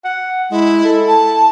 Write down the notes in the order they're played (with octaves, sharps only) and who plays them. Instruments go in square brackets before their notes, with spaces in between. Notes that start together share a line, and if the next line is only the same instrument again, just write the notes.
[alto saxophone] F#5
[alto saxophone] G#3 [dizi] E4
[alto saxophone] A4
[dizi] A5